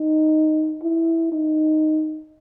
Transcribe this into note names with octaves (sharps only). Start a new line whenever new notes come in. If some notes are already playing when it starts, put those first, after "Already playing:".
Already playing: D#4
E4
D#4